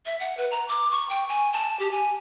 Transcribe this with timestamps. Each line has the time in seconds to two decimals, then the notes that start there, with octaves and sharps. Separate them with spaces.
0.06 E5
0.20 F#5
0.37 B4
0.51 A#5
0.68 D6
0.91 C#6
1.10 G5
1.29 G#5
1.53 A5
1.80 G4
1.91 G#5